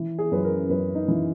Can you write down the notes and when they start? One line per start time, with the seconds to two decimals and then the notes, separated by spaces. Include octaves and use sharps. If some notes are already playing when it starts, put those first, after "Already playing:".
Already playing: E3
0.19 G#4
0.31 F#2 B4
0.44 A#4
0.69 F#2 B4
0.91 C#4
0.95 D#4
1.08 E3